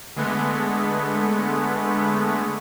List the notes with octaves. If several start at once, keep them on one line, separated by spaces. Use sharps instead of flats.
D3 G#3 A3 B3